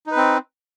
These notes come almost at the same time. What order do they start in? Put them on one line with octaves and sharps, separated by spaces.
D#4 B4 C4